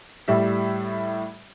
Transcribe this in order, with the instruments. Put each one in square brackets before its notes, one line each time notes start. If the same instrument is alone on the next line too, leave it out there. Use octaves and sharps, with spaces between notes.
[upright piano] A2 G3 E5